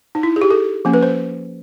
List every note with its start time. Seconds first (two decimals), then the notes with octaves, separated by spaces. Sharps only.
0.15 D#4
0.23 E4
0.36 G#4
0.42 G4
0.51 A4
0.85 F3 A#3 C#4
0.93 B4
1.03 C5